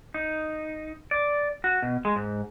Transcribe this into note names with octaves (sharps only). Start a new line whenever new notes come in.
D#4
D5
F#4
B2
G#3
G#2